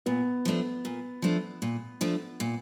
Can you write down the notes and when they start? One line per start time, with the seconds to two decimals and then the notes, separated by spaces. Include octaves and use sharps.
0.06 A#2 B3
0.45 F3 A3 D4
0.85 A#2
1.22 F3 A3 D4
1.62 A#2
2.01 F3 A3 D4
2.40 A#2